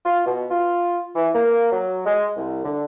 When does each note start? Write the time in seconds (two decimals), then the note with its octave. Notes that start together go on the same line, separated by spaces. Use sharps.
0.05 F4
0.26 B2
0.51 F4
1.15 E3
1.35 A#3
1.72 F#3
2.06 G#3
2.37 C2
2.65 D3